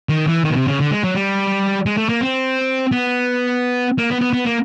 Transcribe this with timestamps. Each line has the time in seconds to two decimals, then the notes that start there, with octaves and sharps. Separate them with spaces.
0.09 D#3
0.27 E3
0.44 D#3
0.51 B2
0.56 C3
0.68 C#3
0.80 D3
0.91 G#3
1.04 F#3
1.14 G3
1.86 G#3
1.97 A3
2.09 A#3
2.21 C4
2.92 B3
3.98 A#3
4.10 B3
4.21 B3
4.33 B3
4.46 A#3